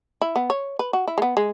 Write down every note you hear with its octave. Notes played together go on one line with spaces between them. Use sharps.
E4
B3
C#5
B4
F#4
E4
G#3
B3
G#3